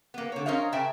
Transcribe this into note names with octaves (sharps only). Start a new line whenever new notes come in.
A#3 B3
D3 C#5
C#4 A#4 C5 C#5 D#5 F5
C#3 A#4 E5 G5 A5